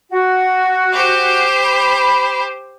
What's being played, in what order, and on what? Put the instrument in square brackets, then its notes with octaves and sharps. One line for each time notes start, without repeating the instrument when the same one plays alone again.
[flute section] F#4
[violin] G4 C5
[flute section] B5